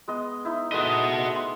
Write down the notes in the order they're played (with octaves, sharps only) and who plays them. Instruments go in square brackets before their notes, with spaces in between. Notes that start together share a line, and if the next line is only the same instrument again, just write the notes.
[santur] G#3 B3 D#5
D#4 E4
[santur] G#3 A3 B3 [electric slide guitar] F#4 D#5
[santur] C6